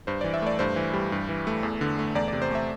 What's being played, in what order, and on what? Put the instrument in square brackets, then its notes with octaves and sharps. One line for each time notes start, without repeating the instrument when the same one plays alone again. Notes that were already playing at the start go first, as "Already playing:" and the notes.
[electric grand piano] G2 C5
E3 D5
E5
A3 D5
G2 C5
E3
G3
G2
E3
A3
E2
D3
A3
E2 D5
D5
C3
C5
A3 E5